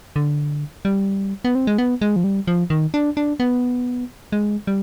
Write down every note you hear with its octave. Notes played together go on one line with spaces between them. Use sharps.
D3
G3
B3
C4
G#3
B3
G#3
F3
G3
F3
D#3
D4
D4
B3
G#3
G3